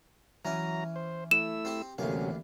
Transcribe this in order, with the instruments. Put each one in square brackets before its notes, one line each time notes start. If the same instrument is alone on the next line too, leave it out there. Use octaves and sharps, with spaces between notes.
[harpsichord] E3 C#4 [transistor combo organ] F#3 A#5
[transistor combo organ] C5
[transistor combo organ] A3 E4 E6 [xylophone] E7
[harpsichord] C4 G4
[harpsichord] A1 D2 A#3 [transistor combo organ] C3 F#3 C#4